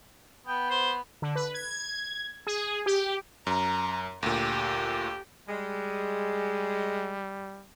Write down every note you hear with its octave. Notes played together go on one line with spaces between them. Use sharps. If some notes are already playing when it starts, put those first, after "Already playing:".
B3 G5
C5
D3
B4
G#6
G#4
G4
F#2 A#5
D2 A#2 G4
G3 G#3